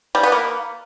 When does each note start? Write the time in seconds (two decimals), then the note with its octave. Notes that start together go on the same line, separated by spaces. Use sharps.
0.15 G3
0.23 B3
0.32 A#3